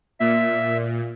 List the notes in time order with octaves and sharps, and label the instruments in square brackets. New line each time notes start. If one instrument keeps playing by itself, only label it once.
[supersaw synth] A#2 [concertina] E5